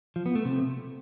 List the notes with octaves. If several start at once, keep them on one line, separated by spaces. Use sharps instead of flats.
F3
B3
A3
C3